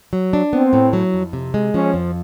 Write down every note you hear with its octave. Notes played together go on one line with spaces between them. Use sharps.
F#3
D4
B3 C4
A2
F#3
F2
C3
G#3
F3 C#4
F2